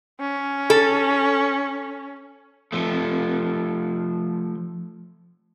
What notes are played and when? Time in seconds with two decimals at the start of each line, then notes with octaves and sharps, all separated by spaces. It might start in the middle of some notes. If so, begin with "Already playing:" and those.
0.20 C#4
0.70 A4
2.73 F3 A3